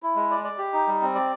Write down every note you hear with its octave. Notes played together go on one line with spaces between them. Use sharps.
E4
G#3
D5
D5
G4
D#4
G3
C4
D5